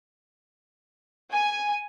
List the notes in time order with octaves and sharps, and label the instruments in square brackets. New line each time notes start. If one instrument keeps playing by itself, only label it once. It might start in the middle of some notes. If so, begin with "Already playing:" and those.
[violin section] G#5